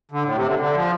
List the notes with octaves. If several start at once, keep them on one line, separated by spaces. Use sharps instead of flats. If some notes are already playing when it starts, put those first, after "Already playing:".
D3
A2
C3
D3
D3
F3